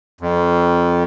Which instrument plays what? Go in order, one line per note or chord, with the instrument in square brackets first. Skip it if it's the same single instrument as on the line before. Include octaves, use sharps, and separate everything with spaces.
[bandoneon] F2